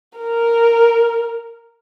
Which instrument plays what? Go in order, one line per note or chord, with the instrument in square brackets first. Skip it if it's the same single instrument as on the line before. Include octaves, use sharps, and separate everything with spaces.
[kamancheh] A#4